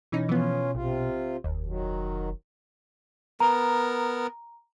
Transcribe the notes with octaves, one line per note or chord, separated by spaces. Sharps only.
B2 E3 C#4 D#4
E3 F3 B3 C#4 F4
A#1 C3 F4
F1 D#2
D#3 F#3
B3 A#4 A#5